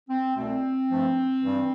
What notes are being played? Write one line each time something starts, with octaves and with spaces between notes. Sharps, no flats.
C4
C2 B2 A3 C4
G2 F3 A3
G2 E3 G3